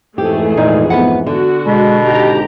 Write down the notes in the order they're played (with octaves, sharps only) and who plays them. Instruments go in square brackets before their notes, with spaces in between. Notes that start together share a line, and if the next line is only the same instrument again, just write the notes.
[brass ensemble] F2 G#2 E3 [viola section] A3 G#4 [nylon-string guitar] G4
[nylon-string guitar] A#2 D#4
B3 B4 F#5
[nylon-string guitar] D3 [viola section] F#4
[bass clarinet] B2 [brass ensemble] G#3
[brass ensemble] G#1 G#2 [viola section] G4 A#5